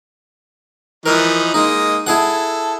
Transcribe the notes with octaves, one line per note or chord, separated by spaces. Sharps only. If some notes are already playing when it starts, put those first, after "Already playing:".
E3 F3 D#4 A#4
G#3 A#3 D#4 D#5
E4 G#4 A4 F#5